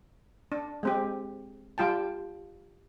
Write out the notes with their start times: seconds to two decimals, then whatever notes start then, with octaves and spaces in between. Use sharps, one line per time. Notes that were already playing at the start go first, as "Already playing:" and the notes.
0.52 D4
0.83 G#3 C4 G4
1.78 G3 F4 G5 A5